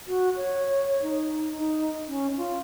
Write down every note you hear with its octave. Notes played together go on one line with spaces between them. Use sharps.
F#4
C#5
D#4
D#4
C#4
F4